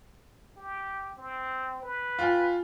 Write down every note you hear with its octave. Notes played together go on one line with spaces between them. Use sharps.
G4
C4
B4
F4 G5 G#5